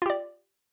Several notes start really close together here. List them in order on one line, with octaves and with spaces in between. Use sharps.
F4 G4 D5